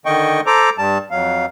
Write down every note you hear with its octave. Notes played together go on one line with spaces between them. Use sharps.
D3 D#3 D#5 G5 C#6
A4 C5 A#5 D6
G2 G3 A5
F2 F#3 F5